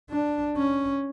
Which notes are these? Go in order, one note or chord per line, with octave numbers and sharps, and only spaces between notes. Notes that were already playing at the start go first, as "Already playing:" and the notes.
D4
C#4